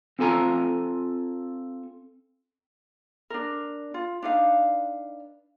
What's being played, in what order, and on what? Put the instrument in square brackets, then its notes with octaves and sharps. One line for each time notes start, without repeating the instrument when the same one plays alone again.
[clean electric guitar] C4 F4 A4 G#5 A#5
[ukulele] D4 A#4
F4
D4 D#4 B4 F5